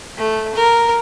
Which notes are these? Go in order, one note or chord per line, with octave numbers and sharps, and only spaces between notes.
A3
A#4